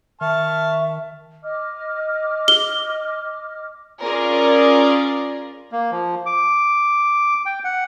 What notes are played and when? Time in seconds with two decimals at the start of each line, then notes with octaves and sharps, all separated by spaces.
0.21 D#3 E5 A5 C#6 F6
1.43 D#5 D6 F6
2.48 G7
4.01 C#4 F4 G#4 A#4 D5
5.72 A#3
5.91 F3
6.26 D6
7.46 G5
7.64 F#5